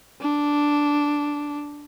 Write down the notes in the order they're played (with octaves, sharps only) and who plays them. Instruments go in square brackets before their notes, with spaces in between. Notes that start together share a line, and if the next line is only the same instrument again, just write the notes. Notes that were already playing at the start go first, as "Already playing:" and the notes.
[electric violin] D4